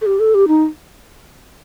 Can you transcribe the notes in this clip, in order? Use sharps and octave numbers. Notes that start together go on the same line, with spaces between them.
A4
G4
A4
G4
D#4